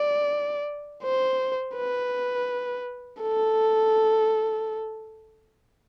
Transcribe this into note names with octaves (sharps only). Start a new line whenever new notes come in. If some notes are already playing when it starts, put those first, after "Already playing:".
Already playing: D5
C5
B4
A4